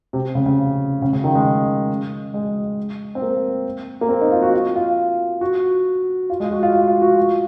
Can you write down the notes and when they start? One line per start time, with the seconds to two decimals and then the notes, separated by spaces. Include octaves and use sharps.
0.13 C3
0.35 C#3
0.46 C#3
1.02 C#3
1.13 C#3
1.24 D#3
1.35 G#3
2.34 G#3
3.15 C4
3.22 A#3
4.01 A#3
4.09 C4
4.21 D#4
4.32 F4
4.42 F#4
4.54 F4
4.76 F4
5.41 F#4
6.30 F4
6.40 G#3
6.52 F#4
6.63 F4
6.73 F4
6.87 F4
7.02 F#4
7.17 F4